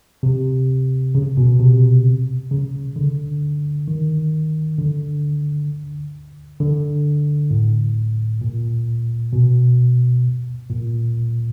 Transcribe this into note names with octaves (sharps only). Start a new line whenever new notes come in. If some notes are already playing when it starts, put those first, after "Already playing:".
C3
C#3
B2
C3
C#3
D3
D#3
D3
D3
A2
A#2
B2
A#2